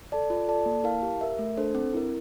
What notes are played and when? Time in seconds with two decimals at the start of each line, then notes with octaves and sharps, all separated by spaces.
0.12 A4 D5 A5
0.30 F4
0.48 A4 D5 A5
0.66 A#3
0.84 E4 A#4 F5 A5
1.03 G4
1.21 A#4 E5
1.39 A3
1.57 D4 A4 C5
1.75 C4
1.94 E4 A#4